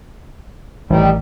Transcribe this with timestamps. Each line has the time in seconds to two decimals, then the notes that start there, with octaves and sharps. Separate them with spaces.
0.90 A1 D#3 G3